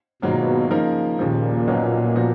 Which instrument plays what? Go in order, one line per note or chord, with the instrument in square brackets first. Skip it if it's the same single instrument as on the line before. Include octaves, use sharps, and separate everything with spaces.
[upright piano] G#1 G#2 F#3 A#3 F4 [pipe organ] B2
[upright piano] C#3 F3 A#3 D#4 A#4
[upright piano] D#2 C#3 F3 [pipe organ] A#2
[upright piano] B1 B2 F#3 A#3 C#4
F3 B3 F#4